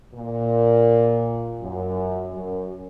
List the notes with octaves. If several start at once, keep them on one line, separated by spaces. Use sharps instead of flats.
A#2
F#2
F#2